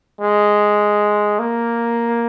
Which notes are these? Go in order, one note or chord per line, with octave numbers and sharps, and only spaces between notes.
G#3
A#3